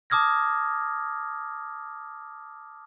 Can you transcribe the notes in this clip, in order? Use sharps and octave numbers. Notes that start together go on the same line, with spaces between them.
A5 D6 D#6 F6 G#6 A#6